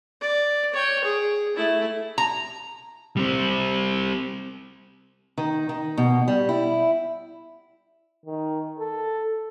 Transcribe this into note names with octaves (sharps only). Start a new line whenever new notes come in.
D5
C#5 G5
G#4
A3 E4
A#5
G3 C4
D#3
D#3
B2
G3
E4
D#3
A4